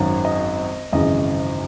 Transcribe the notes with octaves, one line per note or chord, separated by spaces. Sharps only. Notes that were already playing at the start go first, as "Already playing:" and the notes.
Already playing: G#1 F#2 D#3 F#3
D#5
G#1 F#2 C#3 E3 D#5